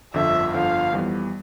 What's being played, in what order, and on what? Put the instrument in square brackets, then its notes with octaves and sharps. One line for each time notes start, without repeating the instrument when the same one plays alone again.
[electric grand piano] G1 F2 D3 F3 [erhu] E5
[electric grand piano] G1 F2 D3 F3 [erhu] F5
[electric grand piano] F2 E3 G3 B3